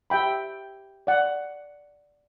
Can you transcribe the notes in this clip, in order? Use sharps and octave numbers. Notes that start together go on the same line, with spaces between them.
G4 E5 G5 B5
D5 F#5